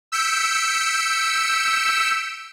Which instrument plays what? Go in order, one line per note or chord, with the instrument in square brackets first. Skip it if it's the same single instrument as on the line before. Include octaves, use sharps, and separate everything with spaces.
[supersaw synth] E6 G6 B6 C#7 D7